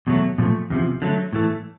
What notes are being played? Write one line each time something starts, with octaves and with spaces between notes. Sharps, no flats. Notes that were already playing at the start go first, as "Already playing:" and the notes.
E2 B2 F#3 A3
A#2 F3 A3
E2 C3 F3
D3 F#3 A3
A2 E3 A3